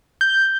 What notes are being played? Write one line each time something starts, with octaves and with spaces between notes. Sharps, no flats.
G6